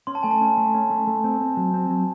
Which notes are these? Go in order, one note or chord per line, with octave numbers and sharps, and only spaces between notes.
C#4 C6
A5
A3 G#5
A5
C#4
A3
C#4
A3
A3
C4
C4
F#3
C4
F#3